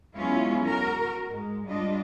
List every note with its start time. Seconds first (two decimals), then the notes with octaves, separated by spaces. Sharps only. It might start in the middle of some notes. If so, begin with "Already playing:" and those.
0.14 F#3 G#3 B3 C#4 E4 F4
0.64 F#4 A#4
1.30 G#2 G#3
1.67 G3 D4 F4 D#5